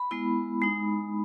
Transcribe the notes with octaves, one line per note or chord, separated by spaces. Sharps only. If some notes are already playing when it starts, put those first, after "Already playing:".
Already playing: B5
G#3 B3 E4
G#3 D#4